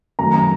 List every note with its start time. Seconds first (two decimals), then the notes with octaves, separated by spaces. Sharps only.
0.19 F#2 D#3 F#3 A3 A#5
0.34 A#5